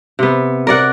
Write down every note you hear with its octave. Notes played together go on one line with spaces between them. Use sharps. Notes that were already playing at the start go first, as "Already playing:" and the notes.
C3 B3
A#4 D5 F#5